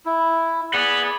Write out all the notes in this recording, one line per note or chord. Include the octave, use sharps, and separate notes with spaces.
E4
G#4 B4 D5 F#5